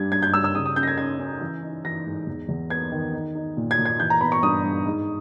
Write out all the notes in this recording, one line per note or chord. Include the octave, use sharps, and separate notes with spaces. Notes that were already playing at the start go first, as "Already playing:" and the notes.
Already playing: G2 G3 G#6
G2 G#6
G6
G3 E6
E6
C#3 D#6
D#6
C#4 G6
A#6
G#6
C#4 G#6
C#4
E3
D#4
E3 A#6
G#2
E2
E2
B3 G#6
D#3
D#4
D#4
A#2
G#6
A#2
G#6
E3 G6
A#5
B3 B5
C#6
G2 D#6
G2
G#2